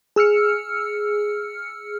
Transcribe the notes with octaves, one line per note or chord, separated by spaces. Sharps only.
G#4 E6 F6 C#7